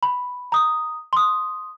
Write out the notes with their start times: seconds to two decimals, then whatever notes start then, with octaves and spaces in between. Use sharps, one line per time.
0.03 B5
0.52 A#5 D#6
1.13 C6 D#6